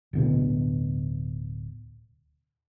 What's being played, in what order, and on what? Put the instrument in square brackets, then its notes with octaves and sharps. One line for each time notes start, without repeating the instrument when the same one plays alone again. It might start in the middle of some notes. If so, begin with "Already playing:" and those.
[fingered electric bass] D1 D2 B2